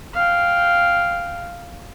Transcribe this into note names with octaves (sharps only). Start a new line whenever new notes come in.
F5 G5